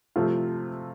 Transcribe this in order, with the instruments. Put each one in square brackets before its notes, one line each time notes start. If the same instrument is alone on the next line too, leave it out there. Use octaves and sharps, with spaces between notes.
[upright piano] C3 F3 A3 C4 F4